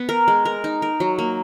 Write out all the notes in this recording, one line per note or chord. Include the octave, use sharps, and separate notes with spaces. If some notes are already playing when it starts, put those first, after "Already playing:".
Already playing: B3
A#4
G#3
A#4
D#4
A#4
F#3
A#3